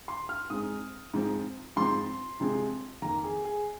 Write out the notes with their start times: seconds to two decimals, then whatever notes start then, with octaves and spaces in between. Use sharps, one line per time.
0.08 C6
0.29 F6
0.50 G#2 G#3 C4 D#6
1.14 G#2 F3 C4
1.76 G#2 F3 C4 C6
2.40 C3 F3 G#3 C4
3.02 F2 D#3 A#3 A#5
3.24 G#4
3.45 G#4